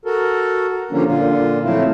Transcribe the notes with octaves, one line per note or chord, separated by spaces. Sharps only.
F#4 A4 A#4
D3 F3 G3 A#3 C#4 D4
A#2 D3 F4
F3 F#3 A3 C4 E4 F4